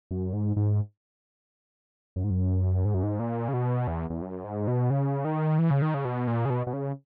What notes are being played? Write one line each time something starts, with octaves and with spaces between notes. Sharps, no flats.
F#2
G#2
G#2
F#2
G#2
F#2
G#2
F#2
G#2
A#2
C#3
B2
E2
E2
F#2
G#2
B2
C#3
D#3
E3
C#3
D#3
C#3
B2
A#2
C#3
B2
B2
C#3